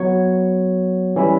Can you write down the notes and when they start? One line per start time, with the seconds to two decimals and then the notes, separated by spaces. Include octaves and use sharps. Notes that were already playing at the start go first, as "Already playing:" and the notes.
Already playing: F#3 B3 F#4 C#5
1.16 E3 G3 C#4 E4